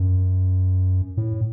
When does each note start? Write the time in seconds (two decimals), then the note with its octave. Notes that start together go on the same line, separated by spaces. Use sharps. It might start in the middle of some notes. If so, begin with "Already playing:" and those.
Already playing: F#2
1.17 A2